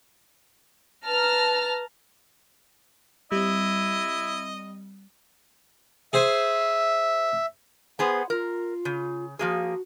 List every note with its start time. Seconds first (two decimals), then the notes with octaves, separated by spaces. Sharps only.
1.07 B4 A5 A#5 F6
3.32 G3 C4 E4 D#5
6.13 G#4 C5 E5 G#5
7.99 B3 G#4 C5 F#5
8.30 F4 A#4
8.85 C#3
9.39 F3 A#3 F#4 G#4